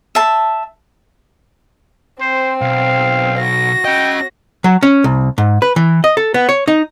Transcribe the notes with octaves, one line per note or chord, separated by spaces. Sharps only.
E5 A5
C4 C5
B1 F5
F#4 A#6
C#4 D#5 G5
F#3
C#4
C2
G#2
B4
E3
D#5
A4
B3
C#5
D#4